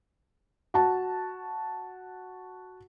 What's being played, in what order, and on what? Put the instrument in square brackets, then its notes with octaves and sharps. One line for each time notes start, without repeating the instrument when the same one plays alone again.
[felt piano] F#4 A5